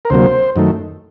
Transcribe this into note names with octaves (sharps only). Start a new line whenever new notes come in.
A#4
D2 C3 F#3 A#3 C5
F#2 D#3 A3